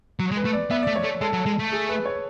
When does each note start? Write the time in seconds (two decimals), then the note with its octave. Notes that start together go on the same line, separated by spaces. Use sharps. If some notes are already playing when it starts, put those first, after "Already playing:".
0.19 F#3
0.31 G#3
0.37 B4
0.45 A3
0.53 D5
0.71 B3 E5
0.83 A3 D5
0.96 C#5
1.04 A3
1.21 G#3 A4
1.33 F#3
1.46 G#3
1.59 A3
1.72 G#4
1.89 B4
2.06 C#5